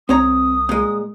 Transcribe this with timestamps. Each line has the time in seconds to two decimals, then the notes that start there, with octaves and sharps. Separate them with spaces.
0.09 C2 C4 C#5 A#5 D#6
0.69 A#2 G#3